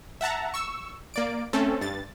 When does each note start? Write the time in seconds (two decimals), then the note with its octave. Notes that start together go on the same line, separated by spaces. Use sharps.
0.21 E5 F#5 A5 A#5
0.54 C#6 E6
1.14 A#3 D5 D7
1.53 A3 C4 C#4 A4
1.81 G2 A6